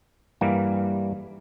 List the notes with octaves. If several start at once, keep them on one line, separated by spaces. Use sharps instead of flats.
G2 E3 G3 A#3